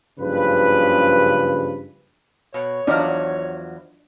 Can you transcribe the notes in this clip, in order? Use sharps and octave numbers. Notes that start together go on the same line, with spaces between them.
F#1 G2 C#3 F3 B4
B2 C#5
E2 F3 F#3 D4 D#4 D5